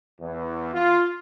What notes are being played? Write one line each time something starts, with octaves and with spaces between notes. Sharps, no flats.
E2
F4